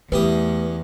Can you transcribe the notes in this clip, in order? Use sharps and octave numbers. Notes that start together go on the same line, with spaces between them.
E2 E3 A3 G4 B4 D#6